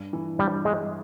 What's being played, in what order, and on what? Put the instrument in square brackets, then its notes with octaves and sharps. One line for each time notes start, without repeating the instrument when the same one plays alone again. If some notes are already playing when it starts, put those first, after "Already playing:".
Already playing: [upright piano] G2
E3
[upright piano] G2 [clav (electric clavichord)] G3
[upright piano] G2 [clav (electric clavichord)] G#3